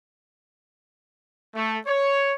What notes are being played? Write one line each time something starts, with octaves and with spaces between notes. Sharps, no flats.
A3
C#5